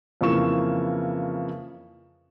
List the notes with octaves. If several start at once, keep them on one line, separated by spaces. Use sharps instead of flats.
F2 C#3 E3 A#3 C#6 E7